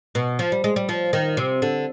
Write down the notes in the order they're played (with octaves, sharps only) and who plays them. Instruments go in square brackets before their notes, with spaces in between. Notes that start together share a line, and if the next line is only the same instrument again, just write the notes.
[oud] B2
F3
G3
G#3
G3
F3
D#3
C3
D3